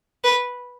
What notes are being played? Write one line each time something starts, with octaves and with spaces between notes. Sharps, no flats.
B4